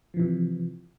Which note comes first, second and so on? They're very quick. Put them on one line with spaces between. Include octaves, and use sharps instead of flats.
F3 E3 C3